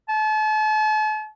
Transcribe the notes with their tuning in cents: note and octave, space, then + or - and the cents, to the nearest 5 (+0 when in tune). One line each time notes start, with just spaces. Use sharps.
A5 -40